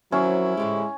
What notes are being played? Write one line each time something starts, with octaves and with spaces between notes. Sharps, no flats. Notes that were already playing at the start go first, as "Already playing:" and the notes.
D#3 F3 F#3 C4 C#4 E4
A2 D3 G#3 G4